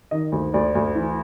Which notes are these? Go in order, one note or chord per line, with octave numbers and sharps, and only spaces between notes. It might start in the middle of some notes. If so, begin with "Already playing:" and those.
D#3 D#5
D2
D2 D5
D2
E3